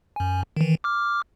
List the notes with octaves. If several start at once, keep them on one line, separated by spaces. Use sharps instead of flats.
F#2 G#5
D#3 E3
D6 F6